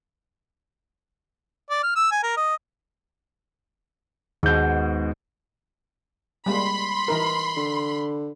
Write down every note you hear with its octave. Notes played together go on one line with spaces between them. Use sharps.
D5
F6
E6
G#5
A#4
D#5
D#2 G#2 B2 G6
G3 G#3 A#3 B5 C6
E3 D#4 A#4
D3